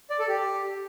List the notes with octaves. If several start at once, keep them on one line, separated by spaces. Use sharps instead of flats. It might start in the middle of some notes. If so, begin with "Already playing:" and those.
D5
A4
G4